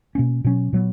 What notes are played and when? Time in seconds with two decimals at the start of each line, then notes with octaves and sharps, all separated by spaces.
0.15 B2 A#3 C#4
0.44 B2 F#3 C#4
0.73 A#2 F#3 B3